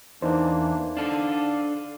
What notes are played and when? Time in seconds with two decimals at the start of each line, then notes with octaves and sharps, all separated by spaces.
0.22 E2 E3 A#3 D4 D#4 C5
0.97 D4 A4 F5